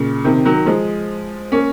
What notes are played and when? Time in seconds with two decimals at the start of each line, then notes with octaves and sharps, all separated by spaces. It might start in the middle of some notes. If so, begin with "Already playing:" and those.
Already playing: A#2 C#3
0.24 C3 D#3
0.45 D#3 F#3
0.66 F3 G#3
1.52 A#3 C#4